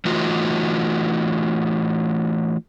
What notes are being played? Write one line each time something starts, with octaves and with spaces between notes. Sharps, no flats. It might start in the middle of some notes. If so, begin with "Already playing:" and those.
E3 A3 D#4 F4 F#4